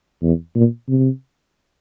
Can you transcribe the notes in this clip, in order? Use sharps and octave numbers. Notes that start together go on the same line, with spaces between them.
E2
A#2
C3